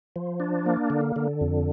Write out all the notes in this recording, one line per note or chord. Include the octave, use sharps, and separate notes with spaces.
F3
D4
A#3
D3
D3
F2